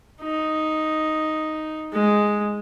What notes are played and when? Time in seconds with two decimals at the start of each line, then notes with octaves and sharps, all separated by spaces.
0.22 D#4
1.93 G#3